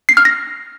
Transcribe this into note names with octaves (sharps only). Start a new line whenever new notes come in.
C7
F6
A#6